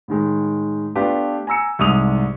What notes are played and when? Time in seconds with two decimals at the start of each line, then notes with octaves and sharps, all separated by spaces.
0.08 A2 D#3 G#3
0.95 A3 B3 D4 F4 G4 B4
1.47 G#5 A#5 E6 C#7
1.79 C2 G#2 D#6 F7